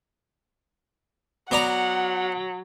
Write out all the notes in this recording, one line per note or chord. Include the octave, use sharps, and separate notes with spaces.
F#3 B3 D5 F#5 A#5